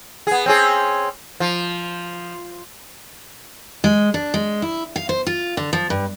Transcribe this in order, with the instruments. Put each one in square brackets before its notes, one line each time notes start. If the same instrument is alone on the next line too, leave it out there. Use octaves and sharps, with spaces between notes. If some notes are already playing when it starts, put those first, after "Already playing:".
[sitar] B3 G#4
C4 C#4 G#4
F3
[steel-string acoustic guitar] G#3
D4
G#3
E4
F5
C5
F4
D3
F3
G2